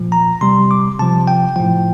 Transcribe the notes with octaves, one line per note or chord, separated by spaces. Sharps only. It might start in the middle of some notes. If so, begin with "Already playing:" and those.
Already playing: A#2 F3
A#5
C3 G3 C6
D6
C3 F3 A5
G5
A2 F3 G5